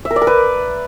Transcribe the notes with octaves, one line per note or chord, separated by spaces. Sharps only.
E5
A#4
D5
A#4
B4